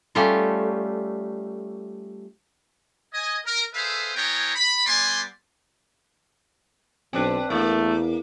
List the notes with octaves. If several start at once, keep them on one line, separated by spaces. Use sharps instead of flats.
G3 A3 C#4 F4
D#5 G#5
A#4
G#4 A4 B4 C5 E5 F5
B3 E4 G#4 C#5 G5 A#5
B5
G3 B3 D5 G#5 C6
B1 C4 D4 B4
E2 A3 A#3